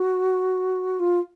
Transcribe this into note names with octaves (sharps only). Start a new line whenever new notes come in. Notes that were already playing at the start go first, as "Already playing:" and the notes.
Already playing: F#4
F4